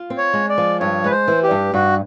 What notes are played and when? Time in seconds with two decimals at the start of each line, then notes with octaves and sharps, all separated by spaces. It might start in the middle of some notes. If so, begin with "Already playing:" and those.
Already playing: F4
0.10 C4
0.18 C#5
0.34 G#3
0.49 D5
0.58 F3
0.80 G2 C#5
1.04 G#3 B4
1.11 C5
1.28 E3
1.43 G4
1.51 G2
1.73 G2 F#4